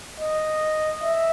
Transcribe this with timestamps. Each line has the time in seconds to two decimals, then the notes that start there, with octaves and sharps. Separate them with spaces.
0.20 D#5
1.03 E5